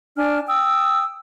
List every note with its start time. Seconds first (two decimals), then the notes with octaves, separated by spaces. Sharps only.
0.16 D4 G#5 F6
0.48 G5 D#6 E6